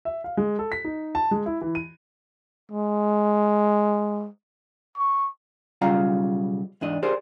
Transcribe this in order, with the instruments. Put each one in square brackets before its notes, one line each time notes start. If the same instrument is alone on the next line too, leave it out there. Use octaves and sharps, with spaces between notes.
[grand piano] E5
F5
G#3
A4
B6
D#4
A5
G#3
E4
E3
D#7
[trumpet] G#3
C#6
[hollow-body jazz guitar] B1 C#3 G3 F4 F5 A#5
E2 G#2 D4 D#5
G4 G#4 A#4 C5 D5